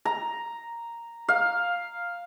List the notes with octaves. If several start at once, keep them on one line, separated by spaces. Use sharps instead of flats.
A#5
F5